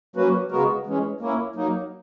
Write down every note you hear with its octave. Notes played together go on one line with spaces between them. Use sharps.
F#3 A#3 C#4 F#4 B4
C#3 G#3 B3 F#4 A#4
E3 G#3 C#4
A#3 C#4 E4
F#3 A#3 D#4